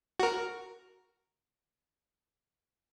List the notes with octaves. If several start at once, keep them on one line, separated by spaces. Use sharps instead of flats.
F#4 A#4